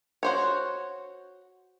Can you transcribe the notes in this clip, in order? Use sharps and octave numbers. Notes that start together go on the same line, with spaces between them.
F#4 C5 C#5